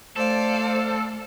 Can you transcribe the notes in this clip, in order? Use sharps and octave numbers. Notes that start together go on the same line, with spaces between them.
A3 A4 C5 D5 F5